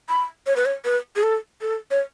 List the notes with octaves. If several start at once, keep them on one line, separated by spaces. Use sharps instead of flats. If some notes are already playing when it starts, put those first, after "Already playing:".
B5
C#5
B4
C#5
B4
G#4
A4
A4
C#5